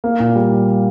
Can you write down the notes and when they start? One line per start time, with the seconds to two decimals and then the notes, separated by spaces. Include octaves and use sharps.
0.04 A#3
0.20 A#2
0.35 G3